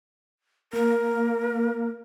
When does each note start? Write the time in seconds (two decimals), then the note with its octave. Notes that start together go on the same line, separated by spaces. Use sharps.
0.73 A#3 A#4